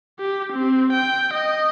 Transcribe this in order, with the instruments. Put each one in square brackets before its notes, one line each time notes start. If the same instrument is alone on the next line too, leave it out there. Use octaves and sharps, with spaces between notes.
[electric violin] G4
C4
G5
D#5